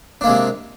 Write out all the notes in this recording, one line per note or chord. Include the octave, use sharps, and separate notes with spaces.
C3 G#3 A#3 D4